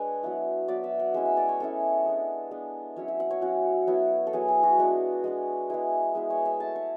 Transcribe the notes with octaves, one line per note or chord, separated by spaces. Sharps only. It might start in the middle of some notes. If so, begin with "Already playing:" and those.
Already playing: G#3 D4 B4 C#5
F#3 B3 E4
F#3 B3 E4 D5
E5
F#5
G#3 C#4 E4 E5
E5
D5
C#5
G#3 C#4 E4 A4
G#3 B3 D4
G#3 B3 D4
F#3 C#4 E4 C#5
E5
F#5
C#5
F#3 C#4 E4 F#4
F#3 B3 E4
A4
F#3 B3 E4 G#4
G#4
F#4
G#3 B3 D4
G#3 B3 D4
G#3 B3 E4 G#4
G#3 B3 E4 G#4
C#5
E5
A3 E4 A5
C#6